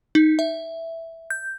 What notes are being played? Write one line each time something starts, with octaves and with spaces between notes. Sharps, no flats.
D#4
E5
G6